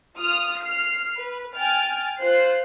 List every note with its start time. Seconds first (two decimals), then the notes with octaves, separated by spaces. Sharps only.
0.17 F4 D#6 F6
0.61 F6 C7
1.17 B4
1.56 G5 G#5 F6 A6
2.19 F4 C5 F#6 C7